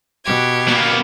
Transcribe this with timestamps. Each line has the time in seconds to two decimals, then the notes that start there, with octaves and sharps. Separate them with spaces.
0.24 B2 G4 G#6
0.67 A#3 B3